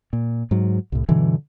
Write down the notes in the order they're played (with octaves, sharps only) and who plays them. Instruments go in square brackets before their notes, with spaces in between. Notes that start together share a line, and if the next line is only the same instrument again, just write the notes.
[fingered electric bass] A#2
G#2 F#3
C2 A2
G2 B2 D3 E3